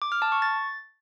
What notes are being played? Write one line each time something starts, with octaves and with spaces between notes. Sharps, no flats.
D6
F6
A5
C#6
A6